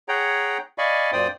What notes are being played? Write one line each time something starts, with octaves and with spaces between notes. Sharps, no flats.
G#4 C#5 F#5 G5 A#5
D5 D#5 F5 G#5 B5 C#6
F#2 A#2 C5 D5 G5 D#6